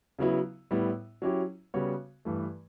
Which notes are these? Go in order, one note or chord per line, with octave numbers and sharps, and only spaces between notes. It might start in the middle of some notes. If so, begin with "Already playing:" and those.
C#3 F#3 B3 E4
A2 G3 B3 E4
F#3 C#4 E4 G4
C#3 G3 B3 F#4 C#5
G2 E3 A3